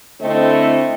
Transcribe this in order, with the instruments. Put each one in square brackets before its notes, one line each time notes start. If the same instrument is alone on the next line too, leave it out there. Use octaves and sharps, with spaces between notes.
[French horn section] D3 A3 C4 E4 C5 D#5